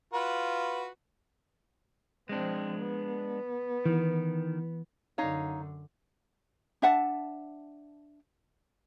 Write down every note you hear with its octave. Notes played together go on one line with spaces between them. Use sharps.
F4 F#4 B4
F3 G#3 C4 D4
B3
D#3 E3
F#2 D3 D#4 C#5 F5
D4 E5 F#5 A5